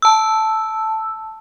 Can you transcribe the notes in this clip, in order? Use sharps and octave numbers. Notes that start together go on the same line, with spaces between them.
A5 E6